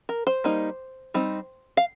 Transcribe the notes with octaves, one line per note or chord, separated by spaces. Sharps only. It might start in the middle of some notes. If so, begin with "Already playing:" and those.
A#4
C5
G3 A#3 D#4
G3 C4 D#4
F5